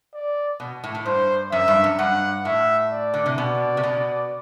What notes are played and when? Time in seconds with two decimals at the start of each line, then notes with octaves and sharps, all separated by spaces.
0.14 D5
0.60 B2
0.84 A2
0.95 A2
1.06 G2 C5
1.52 F#2 E5
1.68 G2
1.84 F#2
1.99 G2 F#5
2.45 A2 E5
2.91 D5
3.14 D3
3.26 C3
3.37 B2 D5
3.77 C3
3.84 B2